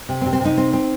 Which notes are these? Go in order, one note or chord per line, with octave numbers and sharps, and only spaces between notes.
C3
C4
C3
C4
C3 D#4
C4
C4